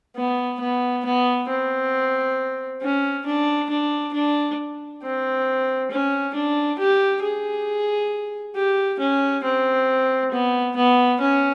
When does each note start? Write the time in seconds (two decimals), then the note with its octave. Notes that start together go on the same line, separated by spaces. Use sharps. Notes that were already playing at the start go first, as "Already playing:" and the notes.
0.16 B3
0.60 B3
1.05 B3
1.48 C4
2.82 C#4
3.25 D4
3.69 D4
4.13 D4
5.02 C4
5.91 C#4
6.34 D4
6.79 G4
7.23 G#4
8.55 G4
8.99 C#4
9.44 C4
10.32 B3
10.76 B3
11.20 C#4